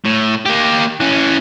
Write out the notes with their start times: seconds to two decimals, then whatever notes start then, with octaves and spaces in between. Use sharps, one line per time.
0.05 A2
0.46 A#3 G4
1.00 E3 C#4